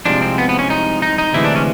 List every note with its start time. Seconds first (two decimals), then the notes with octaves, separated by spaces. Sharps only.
0.05 C2 C3 F3 G#3 D4
0.21 C4
0.38 B3
0.49 B3
0.59 C#4
0.70 D#4
1.02 D#4
1.18 D#4
1.33 D2 C3 E3 G#3 E4
1.45 D4
1.56 C#4